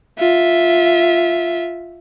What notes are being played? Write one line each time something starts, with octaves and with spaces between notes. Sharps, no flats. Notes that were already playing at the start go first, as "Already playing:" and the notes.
F4 E5